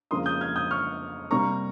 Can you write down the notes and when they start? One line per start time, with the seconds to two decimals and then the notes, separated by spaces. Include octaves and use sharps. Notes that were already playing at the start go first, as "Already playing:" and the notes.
0.11 F2 C#3 F3 A#3 C6 D#6
0.26 D#6 G6
0.41 F6 G#6
0.56 D#6 G6
0.71 C#6 F6
1.31 C3 G3 A#3 A#5 C#6